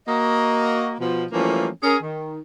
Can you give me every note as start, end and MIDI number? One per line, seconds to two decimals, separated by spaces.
0.08 0.94 58
0.08 0.94 66
0.08 0.94 75
1.00 1.25 47
1.00 1.25 53
1.31 1.69 52
1.31 1.69 53
1.31 1.69 55
1.31 1.69 57
1.31 1.69 58
1.31 1.69 61
1.83 1.96 61
1.83 1.96 68
1.83 1.96 70
2.03 2.40 51